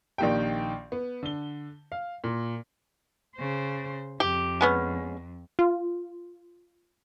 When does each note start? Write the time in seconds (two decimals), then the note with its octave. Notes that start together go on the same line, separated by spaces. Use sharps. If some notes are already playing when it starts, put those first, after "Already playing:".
0.18 A#1 D#3 A#3 G4 G5
0.92 B3
1.23 D3 G7
1.92 F5
2.24 A#2
3.36 C#3 C5
4.20 F2 G4
4.61 G#3 B3 C#4
5.59 F4